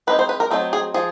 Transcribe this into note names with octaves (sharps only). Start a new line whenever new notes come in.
G#3 C4 D#4 B4
C5
B4
A#4
F#3 A3 C4 D#4 A4
G#4
F3 G#4